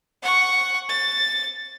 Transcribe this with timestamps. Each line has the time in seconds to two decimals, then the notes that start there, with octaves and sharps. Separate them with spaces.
0.23 F#5 C#6
0.89 A6